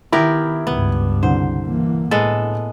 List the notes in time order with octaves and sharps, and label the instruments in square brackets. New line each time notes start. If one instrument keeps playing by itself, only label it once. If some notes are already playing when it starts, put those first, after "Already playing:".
[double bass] D#3 [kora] B3 G4 A#4 [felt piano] E4
[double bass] C#2 G2 [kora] B3
[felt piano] C2 D3 [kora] C5
[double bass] E3 A#3
[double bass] A2 [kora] G#3 B3 A4